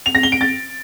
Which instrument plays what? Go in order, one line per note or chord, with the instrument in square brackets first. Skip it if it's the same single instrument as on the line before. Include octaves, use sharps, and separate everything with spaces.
[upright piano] F7
A#6
G7
D7
A6